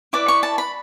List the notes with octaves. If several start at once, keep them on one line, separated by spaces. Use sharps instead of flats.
E4 B4 D5 D6
C#6
A5
B5